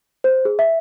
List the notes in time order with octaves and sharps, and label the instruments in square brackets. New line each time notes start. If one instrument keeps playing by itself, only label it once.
[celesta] C5
G#4
E5